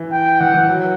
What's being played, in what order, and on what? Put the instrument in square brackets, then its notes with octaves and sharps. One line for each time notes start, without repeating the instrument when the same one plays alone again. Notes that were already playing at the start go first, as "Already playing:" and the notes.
Already playing: [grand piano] E3
[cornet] G5
[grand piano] E3 [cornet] F#5
[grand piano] E3
F#3